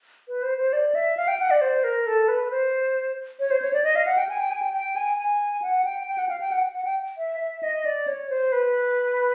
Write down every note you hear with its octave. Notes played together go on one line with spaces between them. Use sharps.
B4
C5
C5
D5
E5
F5
G5
F#5
D5
C5
A#4
A4
B4
C5
C#5
C5
C#5
D5
D#5
F5
F#5
G5
G#5
G5
G#5
G5
G5
G#5
G#5
F#5
G5
G5
F#5
F5
G5
F#5
F#5
G5
E5
E5
D#5
D5
C#5
C5
B4